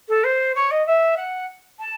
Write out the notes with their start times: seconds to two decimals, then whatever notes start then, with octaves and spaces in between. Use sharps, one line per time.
0.08 A4
0.24 C5
0.55 C#5
0.71 D#5
0.86 E5
1.17 F#5
1.79 A5